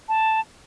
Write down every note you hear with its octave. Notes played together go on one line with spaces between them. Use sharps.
A5